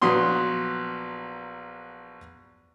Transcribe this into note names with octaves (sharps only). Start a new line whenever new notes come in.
A#1 F#3 B3 C6 D#6